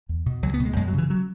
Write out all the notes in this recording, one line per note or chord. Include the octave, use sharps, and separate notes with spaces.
E2
B2
C#2 F#3
B3
B2
G#3
F#2 G#3
F#3
C#3 E3
F#3